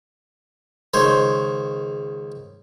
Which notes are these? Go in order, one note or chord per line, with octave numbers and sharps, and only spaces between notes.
C#2 D#3 C5 C#5